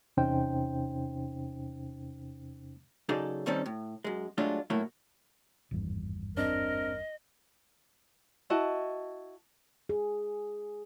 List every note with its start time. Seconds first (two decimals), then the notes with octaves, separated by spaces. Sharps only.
0.17 E2 C3 C#4 D#4 C5 G5
3.09 F#2 C#3 D#4 G#4 A4 D5
3.46 D#3 G3 C4 C#4 D#4 A4
3.66 A2
4.04 F#2 G#3
4.38 F#3 G#3 A3 D4 F4
4.70 A2 F#3 A3 A#3 E4
5.71 G#1 E2 G2
6.37 C4 D4 A#4 D#5
8.50 E4 F#4 D#5 A5
9.89 G#4